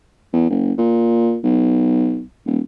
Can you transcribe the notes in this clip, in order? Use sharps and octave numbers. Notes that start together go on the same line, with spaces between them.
E2
F#1
A#2
B1
D#1